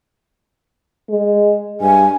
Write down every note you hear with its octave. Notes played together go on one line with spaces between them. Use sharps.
G#3
G2 G#5